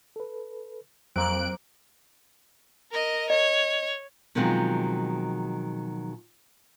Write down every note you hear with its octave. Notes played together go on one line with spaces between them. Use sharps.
A4 B4
F2 F#3 A#3 C4 D6 F#6 D7
A#4 D#5
C#5 D#5
B2 D#3 F3 F#3 G#3 C4